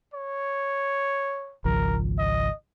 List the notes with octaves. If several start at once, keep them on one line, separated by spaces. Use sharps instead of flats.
C#5
G#1 C#2 F3 A#4
D#5